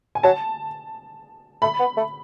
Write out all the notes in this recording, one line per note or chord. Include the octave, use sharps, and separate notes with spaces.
G#5
F#3 A5
A3 B5
B3
A3